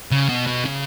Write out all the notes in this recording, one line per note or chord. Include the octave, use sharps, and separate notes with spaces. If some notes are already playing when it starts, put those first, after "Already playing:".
C#3
B2
B2
C#3